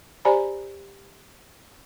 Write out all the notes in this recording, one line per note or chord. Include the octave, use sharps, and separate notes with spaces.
G4 C5 D5 G#5 A#5 B5